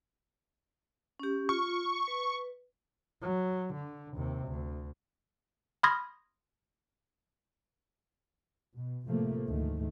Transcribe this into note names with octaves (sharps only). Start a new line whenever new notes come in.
C#4 G4
F4 C#6
B4
F#3
D3
D#2 C3
D2
B5 C6 D#6 F6 G#6 A#6
B2
A2 C3 F3 A3 A#3
D2 G#2 D#3 A3